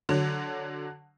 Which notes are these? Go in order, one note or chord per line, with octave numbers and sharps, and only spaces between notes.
D3 F#3